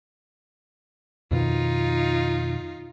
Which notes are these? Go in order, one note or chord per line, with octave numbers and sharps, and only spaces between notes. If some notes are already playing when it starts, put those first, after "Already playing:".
F2 B2 D#3 D#4 F4